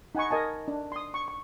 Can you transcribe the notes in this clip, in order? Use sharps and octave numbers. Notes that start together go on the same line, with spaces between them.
D#4 F#5 G#5 B5 C#6
A#4 D#5 G#5 A5
D4
C6 D#6
C#6
C#6